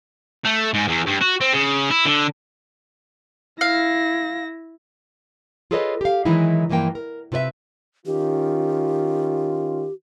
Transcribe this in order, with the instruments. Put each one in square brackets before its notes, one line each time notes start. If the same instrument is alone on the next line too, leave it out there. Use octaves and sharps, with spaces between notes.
[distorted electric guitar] A3
G#2
E2
G2
F#4
C4
C#3
E4
D3
[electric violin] E4 A#6 [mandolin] F5
[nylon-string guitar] F4 G#4 A4 B4 C#5 D#5
G4 F5
D#3 E3 F#3 G#3 D#4 E4
G2 E3 F3 A#3 G5
A#4
C3 F4 B4 D5 E5
[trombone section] D#3 C#4 F4 [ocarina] G4